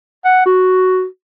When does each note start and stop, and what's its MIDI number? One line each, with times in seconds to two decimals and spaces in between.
0.25 0.45 78
0.46 1.05 66